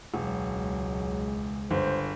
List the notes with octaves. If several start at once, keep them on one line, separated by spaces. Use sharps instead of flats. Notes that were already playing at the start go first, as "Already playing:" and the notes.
E1 C#2 F#3 G#3
G1 C5